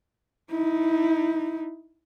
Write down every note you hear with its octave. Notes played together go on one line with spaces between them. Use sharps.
D#4 E4